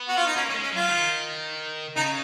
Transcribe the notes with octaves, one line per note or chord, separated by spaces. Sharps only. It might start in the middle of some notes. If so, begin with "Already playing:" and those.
Already playing: B3
F#4
F4
D#4
A#3 C#4
A#3 C#4
G#3
C#4
F#3 F4
D#3
C#3 D#4